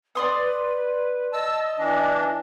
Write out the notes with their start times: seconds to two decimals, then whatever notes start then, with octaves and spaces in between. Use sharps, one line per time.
0.15 B4 D5 C6 D#6
1.33 D#5 A5 E6
1.78 E3 D4